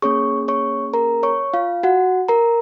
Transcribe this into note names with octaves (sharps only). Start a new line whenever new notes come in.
A#3 C#4 G#4 C#5 C#6
C#5 C#6
A#4 A#5
C#5 C#6
F4 F5
F#4 F#5
A#4 A#5